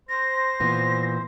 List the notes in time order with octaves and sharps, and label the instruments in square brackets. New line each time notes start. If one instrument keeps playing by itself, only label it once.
[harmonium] C5 [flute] A#6
[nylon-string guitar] A#2 E3 B3